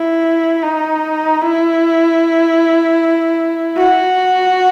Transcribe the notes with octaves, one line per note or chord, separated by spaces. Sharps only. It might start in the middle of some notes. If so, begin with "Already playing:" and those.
Already playing: E4
D#4
E4
F#4